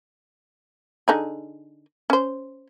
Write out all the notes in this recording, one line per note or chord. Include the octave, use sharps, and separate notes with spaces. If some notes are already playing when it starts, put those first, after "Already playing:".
D3 D#4 G#4
C#4 C5